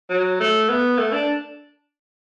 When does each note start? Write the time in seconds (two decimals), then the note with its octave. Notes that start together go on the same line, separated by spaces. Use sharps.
0.10 F#3
0.40 A3
0.69 B3
0.98 A3
1.13 D4